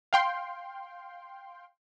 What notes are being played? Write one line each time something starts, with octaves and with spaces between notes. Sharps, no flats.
F5 G5 C6